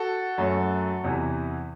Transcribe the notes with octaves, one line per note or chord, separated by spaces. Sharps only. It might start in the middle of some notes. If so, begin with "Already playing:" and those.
Already playing: F#4 A4
F#2 F#3 A3
E2 C3 E3